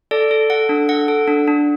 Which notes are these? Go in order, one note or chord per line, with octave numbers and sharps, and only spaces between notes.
A4 D5
A4
A4 F#5
D4
A4 F#5
A4
D4
D4